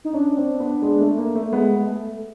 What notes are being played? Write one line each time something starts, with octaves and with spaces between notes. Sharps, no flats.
D#4
C#4 D4
C4
B3
G#3
A3
A#3
A3
G#3 B3
G#3
A3